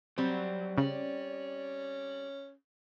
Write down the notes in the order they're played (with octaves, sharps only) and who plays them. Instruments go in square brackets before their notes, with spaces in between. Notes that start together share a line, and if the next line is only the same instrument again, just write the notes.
[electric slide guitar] F#3 [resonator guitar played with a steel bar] G3 C4
[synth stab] C#3 [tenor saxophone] C#4 [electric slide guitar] D5